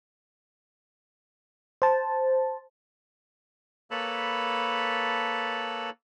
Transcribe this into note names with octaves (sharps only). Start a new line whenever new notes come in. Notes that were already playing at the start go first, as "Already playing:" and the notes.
C5 A5
A#3 A4 B4 C#5 A5 B5